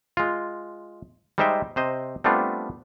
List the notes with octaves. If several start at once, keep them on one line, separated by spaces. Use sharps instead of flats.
G#3 F4
G3 G#3 D#4 C5 E5 G5
C3 C5 D#5
G3 A3 B3 C4 D4 F4